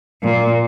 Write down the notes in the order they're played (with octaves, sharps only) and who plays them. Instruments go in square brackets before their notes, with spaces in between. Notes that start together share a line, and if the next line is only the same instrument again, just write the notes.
[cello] A#2